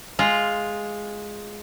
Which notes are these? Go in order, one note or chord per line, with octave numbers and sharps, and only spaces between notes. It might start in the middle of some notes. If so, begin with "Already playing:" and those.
G#3 F4